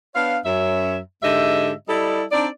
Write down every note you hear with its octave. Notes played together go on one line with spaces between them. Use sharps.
B3 D4 C#5 F5
F#2 C#5 E5
G#2 D3 G4 D#5 E5
G3 E4 G4 A4 D5 D#5
C4 D4 D#4 D5